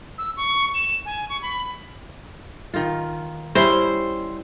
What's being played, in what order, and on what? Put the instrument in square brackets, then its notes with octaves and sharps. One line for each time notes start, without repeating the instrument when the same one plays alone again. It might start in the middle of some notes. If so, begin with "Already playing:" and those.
[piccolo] E6
C#6
E7
G#5
C#6
B5
[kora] D#3 F4
[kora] G3 C#4 E4 [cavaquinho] C5